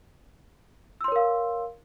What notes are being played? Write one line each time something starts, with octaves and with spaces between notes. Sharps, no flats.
A#4 C#5 F5 C6 E6